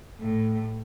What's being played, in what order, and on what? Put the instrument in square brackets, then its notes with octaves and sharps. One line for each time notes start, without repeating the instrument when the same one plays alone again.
[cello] A2